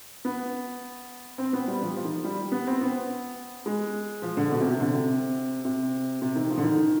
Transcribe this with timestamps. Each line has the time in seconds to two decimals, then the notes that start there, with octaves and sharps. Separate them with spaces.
0.25 B3
1.38 C4
1.53 B3
1.68 G3
1.82 F3
1.96 F3
2.05 D#3
2.24 G3
2.52 B3
2.67 C4
2.81 B3
3.66 G#3
4.22 F3
4.37 D3
4.52 B2
4.60 C3
4.70 C3
4.80 D3
4.94 C3
5.65 C3
6.22 C3
6.36 D#3
6.49 F3
6.58 D3
6.64 D#3